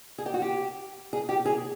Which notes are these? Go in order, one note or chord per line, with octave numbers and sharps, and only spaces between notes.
G#4
G4
F#4
G4
G#4
G4
G#4